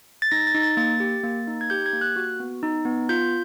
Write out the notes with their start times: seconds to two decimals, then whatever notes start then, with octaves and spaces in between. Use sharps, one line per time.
0.22 A6
0.32 D#4 A#6
0.47 A6
0.54 D#4
0.62 A6
0.77 A#3 A6
1.00 G4
1.23 A#3
1.47 D#4
1.61 G#6
1.70 G4 G6
1.86 G#6
1.93 A#3
2.01 F#6
2.16 F#4
2.40 B3
2.63 D#4
2.85 B3
3.09 F4 G6